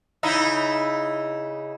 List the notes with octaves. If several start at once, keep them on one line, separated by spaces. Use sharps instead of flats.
C#3 D#4 E4